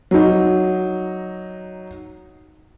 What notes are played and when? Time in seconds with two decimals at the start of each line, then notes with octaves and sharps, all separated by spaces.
0.11 F#3 D#4